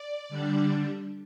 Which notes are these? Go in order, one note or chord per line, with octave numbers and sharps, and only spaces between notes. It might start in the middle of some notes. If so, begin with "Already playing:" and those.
Already playing: D5
D3 G3 D4